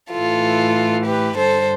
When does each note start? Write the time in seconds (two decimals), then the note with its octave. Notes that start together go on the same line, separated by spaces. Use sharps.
0.12 A2 E3 F4 A4
1.07 G4 B4
1.37 G2 D3 A4 C5